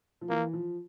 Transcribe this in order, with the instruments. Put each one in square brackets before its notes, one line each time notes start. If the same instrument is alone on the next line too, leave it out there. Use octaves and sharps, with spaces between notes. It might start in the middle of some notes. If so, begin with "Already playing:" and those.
[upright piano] F3
[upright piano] E3 [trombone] A#3
[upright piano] F3